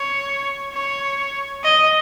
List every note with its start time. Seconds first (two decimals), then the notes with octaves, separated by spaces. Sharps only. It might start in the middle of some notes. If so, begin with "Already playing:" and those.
Already playing: C#5
0.73 C#5
1.64 D#5